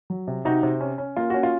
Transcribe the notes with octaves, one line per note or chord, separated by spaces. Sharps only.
F#3
C3
C3 D#4 F#4
C3
C#4
C#4
A#3 F4
C#4 F#4
F4